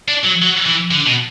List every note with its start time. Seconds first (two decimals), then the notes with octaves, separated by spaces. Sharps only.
0.08 D4
0.24 F#3
0.42 F#3
0.66 E3
0.91 D3
1.06 B2